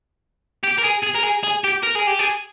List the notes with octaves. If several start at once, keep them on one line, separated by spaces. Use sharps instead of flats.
G4
A#4
G#4
G#4
A#4
G#4
G#4
G4
A#4
G#4
G4
G#4